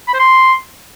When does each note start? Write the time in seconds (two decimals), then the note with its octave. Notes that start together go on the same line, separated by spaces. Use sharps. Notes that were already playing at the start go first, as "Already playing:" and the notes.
0.08 B5
0.14 C5
0.19 C6